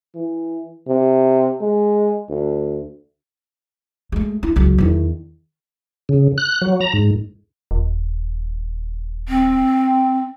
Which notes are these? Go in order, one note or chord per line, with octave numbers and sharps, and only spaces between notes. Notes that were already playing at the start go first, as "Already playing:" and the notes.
E3
C3
G#3
D2
G#3 A3
E4
C#2 F#3
E2 D#3
C#3
F#6
F#3
A#5
G#2
D#1
C4